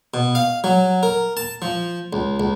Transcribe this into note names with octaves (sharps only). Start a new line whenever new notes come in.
B2
F5
F#3
A#4
A5
F3
C#2
C#2